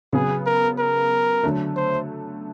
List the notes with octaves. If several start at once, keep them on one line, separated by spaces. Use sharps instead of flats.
C#3 F#3 B3 G#4
A#4
A#4
D3 F#3 A3
C5